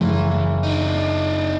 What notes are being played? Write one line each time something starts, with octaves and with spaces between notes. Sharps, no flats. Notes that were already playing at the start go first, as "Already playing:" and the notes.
F#1 E3
D4 D#4